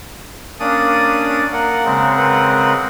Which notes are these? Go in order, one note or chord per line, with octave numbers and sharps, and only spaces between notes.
A#3 C#4 D4 D5 D#6
A#3 A#4 F#5
C#3 G#3 C4
A#4 B4 F#5